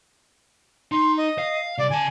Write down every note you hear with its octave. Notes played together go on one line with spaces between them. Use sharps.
D#4 C6
D#5
F5
C2 D5
C#3 G#5 A5